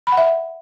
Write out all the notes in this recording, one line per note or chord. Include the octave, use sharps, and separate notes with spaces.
B5
F#5
E5